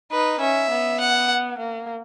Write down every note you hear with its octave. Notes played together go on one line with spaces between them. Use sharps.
D#4 B4
C#4 E5
B3
F#5
A#3